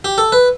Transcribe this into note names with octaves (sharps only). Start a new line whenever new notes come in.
G4
A4
B4